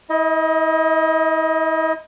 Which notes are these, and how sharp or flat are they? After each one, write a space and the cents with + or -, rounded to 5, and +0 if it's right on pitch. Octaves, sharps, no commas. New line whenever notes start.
E4 -35 D#5 +15